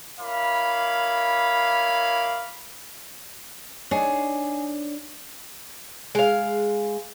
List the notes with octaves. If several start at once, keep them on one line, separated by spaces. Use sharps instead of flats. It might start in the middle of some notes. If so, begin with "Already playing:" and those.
E4 A#4 C#5 F5 B5 D6
D4 D#4 G#4 C#5
G#3 F5